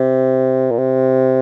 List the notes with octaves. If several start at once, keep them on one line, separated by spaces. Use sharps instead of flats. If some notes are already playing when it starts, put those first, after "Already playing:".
Already playing: C3
A#2
C3